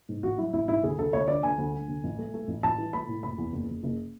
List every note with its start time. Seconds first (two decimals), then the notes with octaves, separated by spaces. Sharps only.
0.09 G#2
0.23 A1 F#4
0.38 F#3 E4
0.53 A1 E4
0.68 G#2 E4
0.83 D2 G#4
0.98 D2 A4
1.13 D2 C#5
1.28 D3 D5
1.43 D2 G#5
1.58 D2
1.74 D3
1.88 D2
2.04 A1
2.18 A3
2.34 A3
2.48 A1
2.63 A1 A5
2.78 E3
2.93 A3 B5
3.08 A2
3.23 F#1 B5
3.38 E2
3.53 F#1
3.68 F#1
3.83 F#1